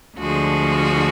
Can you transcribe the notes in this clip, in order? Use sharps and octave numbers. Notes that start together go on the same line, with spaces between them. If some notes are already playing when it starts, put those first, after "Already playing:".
D2 D3 F3 G#3 F#4